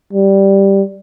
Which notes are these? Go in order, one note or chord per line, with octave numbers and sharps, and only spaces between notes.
G3